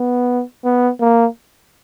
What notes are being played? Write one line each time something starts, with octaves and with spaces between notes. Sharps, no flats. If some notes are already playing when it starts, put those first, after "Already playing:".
Already playing: B3
B3
A#3